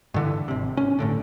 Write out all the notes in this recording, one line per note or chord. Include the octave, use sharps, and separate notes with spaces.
G2 D3 E3
G#1 C3
C#4
G1 A2 D3